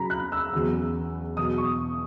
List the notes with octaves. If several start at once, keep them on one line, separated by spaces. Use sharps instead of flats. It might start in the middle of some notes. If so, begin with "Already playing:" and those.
Already playing: F#2 C#3 F#3 A#5 B5
F#6
E6
E2 C#3 F#3
E2 B2 F#3 D#6
C#6